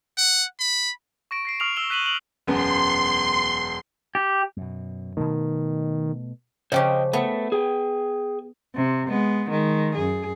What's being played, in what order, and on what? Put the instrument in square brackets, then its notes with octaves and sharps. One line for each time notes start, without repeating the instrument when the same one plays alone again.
[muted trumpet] F#5
B5
[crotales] C#6 A#6 D7
A#6 C7 D7
C#6 D#6 F6 C7 D7 F7
E6 D7 E7 G7
F#6 B6 D#7 E7 F#7
F#7
[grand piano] E1 F#2 B3 [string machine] C6
[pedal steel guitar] G4
[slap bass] F#2 B2
[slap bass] B2 A3 [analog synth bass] D#3
[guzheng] C#3 F3 G4 [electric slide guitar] C5 D#5 G5
[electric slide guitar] A3 [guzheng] B3
[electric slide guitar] G#4 G5
[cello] C3
G#3 B3
D#3 G#3
F#2 G#4